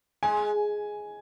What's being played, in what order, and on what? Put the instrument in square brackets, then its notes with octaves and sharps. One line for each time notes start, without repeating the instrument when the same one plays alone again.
[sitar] G#3 [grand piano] G#5